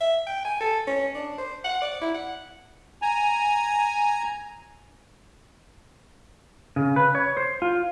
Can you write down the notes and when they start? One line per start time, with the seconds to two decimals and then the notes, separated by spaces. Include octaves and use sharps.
0.01 E5
0.27 G5
0.45 G#5
0.60 A4
0.87 C#4
1.15 D4
1.38 C5
1.64 F#5
1.81 D5
2.01 E4
2.14 F#5
3.02 G#5 A#5
6.76 C#3
6.96 B4
7.15 C#5
7.37 C5
7.62 F4